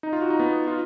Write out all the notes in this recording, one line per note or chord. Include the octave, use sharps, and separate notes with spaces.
D#4
F4
F#4
D#4
B3
F4